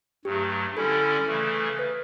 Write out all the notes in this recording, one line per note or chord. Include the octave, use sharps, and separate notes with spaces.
G2 F#3 A3 G4
D3 G3 C#4 E4 A4
C#3 E3 A3
B4